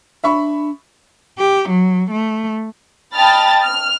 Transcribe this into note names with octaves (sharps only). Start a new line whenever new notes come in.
D4 E5 B5 C#6
G4
F#3
A3
D#5 G5 A5 B5 F6 A6
F6